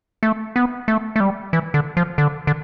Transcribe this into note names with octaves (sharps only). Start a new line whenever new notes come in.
A3
B3
A3
A3
G3
E3
D3
F3
D3
D3